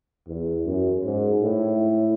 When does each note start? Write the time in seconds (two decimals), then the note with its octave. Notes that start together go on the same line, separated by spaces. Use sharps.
0.27 E2
0.65 F#2
1.04 G#2
1.41 A2